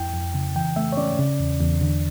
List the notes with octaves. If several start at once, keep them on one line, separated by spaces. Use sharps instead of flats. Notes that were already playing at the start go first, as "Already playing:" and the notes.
Already playing: F2 E4 G5
F2
C#3
E3 G5
A3 E5
C#5
C#4 D5
C#3
E2
E2
D3